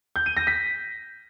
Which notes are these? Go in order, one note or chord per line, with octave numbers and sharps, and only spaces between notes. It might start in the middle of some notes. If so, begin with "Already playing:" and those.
G6
D#7
A#6
B6